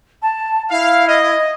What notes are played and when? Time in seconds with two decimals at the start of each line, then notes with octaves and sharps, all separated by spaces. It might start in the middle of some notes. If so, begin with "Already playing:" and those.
0.22 A5
0.70 E4 F5
1.08 D#5